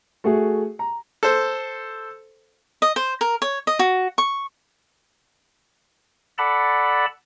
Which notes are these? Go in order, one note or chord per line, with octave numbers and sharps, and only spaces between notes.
A3 F#4 G#4
A#5
A4 C5
D#5
C5
A#4
C#5
D#5
F#4
C#6
A4 D5 F#5 A5 B5